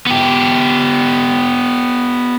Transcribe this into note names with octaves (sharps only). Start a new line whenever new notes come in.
B3 G4